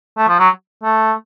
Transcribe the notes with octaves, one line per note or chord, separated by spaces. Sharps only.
A3
F3
F#3
A3